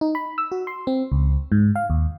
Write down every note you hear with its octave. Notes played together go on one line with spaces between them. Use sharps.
D#4
B5
E6
F#4
C6
C4
C#2
G#2
F5
D#2